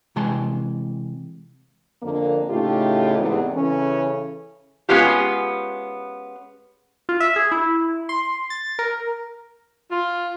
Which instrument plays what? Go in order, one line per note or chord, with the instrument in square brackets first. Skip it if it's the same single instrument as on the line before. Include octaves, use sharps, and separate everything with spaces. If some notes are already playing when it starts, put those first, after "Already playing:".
[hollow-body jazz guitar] C3 E3 G#3 A5 C6
[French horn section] F2 D3 A#3
A2 C#3 A3 D#4 F4 G4
E2 G#2 C3
C#3 E3 C#4 A4
[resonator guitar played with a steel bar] G#3 B3 C#4 F4 G4
[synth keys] F4
E5
G#4
E4
C6
A6
A#4
[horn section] F4